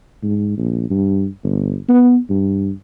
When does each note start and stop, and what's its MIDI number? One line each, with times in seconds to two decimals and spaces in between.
0.23 0.56 44
0.57 0.85 34
0.90 1.26 43
1.43 1.76 31
1.89 2.18 59
2.30 2.71 43